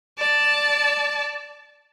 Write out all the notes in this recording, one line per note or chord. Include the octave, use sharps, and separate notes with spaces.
D5 A5